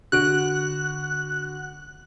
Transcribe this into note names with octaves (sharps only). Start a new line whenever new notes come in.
D3 F#4 F#6 D7